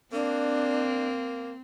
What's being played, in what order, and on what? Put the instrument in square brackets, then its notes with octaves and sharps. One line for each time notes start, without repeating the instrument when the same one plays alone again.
[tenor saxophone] A#3 [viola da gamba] C4 [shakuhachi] D4